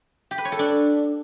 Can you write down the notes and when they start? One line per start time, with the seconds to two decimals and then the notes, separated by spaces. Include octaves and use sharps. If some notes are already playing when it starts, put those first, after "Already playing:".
0.31 G4
0.38 B4
0.45 C#5
0.52 A4
0.59 D4